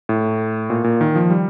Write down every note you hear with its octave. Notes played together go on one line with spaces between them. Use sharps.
A2
A#2
A#2
D#3
F3
G3